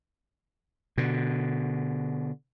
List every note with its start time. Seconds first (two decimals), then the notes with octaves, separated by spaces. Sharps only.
0.98 B2 D3